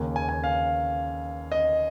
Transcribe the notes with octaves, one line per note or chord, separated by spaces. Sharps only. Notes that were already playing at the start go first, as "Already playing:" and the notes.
Already playing: D#2 C#3 A#3 C#4
G#5
G#5
F5
D#5